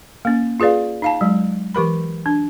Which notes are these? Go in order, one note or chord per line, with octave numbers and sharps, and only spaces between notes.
A#3 C#4
F4 G#4 B4 D5 F5
D#4 F5 A5
F#3 G#3
E3 G4 A#4 B5
D4